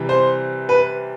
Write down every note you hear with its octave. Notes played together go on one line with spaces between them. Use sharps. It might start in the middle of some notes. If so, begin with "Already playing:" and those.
Already playing: C3 E3 G3
C5
B4